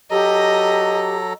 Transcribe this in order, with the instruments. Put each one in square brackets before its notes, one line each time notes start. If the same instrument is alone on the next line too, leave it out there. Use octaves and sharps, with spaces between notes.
[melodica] F#3 A4 A#5 [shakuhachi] G4 [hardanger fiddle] D#5